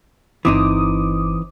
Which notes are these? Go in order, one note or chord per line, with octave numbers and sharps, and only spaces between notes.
G1 E3 C4 D#4 D6 D#6